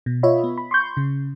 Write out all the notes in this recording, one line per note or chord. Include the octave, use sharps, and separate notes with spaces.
B2
F4 C#5 D#5 E5 B5
B3
B5
C6 C#6 G6
C#3